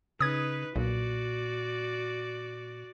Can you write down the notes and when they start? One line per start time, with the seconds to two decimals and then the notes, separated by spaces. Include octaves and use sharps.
0.20 C#3 D#4 B4 D#6 G#6
0.76 B1 A#2 F#4 D5